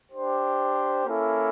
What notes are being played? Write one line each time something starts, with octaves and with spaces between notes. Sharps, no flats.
D4 G4 C5
A#3 C#4 E4 A4